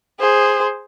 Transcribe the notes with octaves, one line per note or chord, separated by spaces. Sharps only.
G#4 C5